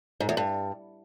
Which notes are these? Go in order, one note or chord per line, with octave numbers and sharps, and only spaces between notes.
G#2
E2
G2